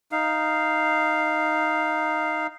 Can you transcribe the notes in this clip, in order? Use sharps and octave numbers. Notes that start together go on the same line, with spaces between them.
D#4 F5